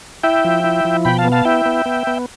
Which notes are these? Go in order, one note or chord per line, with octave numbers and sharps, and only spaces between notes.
E4 E5 G5
F3
E4
F3
B2 G5 B5
F5 A5
B3
F5 A5
E4 E5 G5
B3
B3
B3